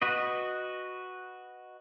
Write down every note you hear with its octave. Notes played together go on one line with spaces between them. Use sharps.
F#4 B4 D#5